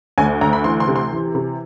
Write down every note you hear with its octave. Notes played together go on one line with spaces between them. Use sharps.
D2 G#5
D2 A#5
B5
E3 C6
C6
C3
C6
E3
C3